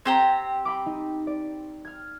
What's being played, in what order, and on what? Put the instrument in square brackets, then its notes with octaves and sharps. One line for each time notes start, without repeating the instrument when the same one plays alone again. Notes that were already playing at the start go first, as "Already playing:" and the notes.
[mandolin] C4 G4 A#5 [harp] G#6
[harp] G5 B5 D6
D#4
D5
F6 G#6